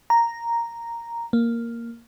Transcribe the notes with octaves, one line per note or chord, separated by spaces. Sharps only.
A#5
A#3